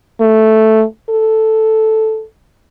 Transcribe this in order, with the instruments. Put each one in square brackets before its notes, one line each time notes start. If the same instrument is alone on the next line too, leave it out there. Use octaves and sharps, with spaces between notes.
[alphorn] A3
A4